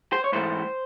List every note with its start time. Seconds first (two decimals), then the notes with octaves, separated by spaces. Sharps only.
0.12 C5
0.24 C#5
0.32 G#2 E3 A3 C5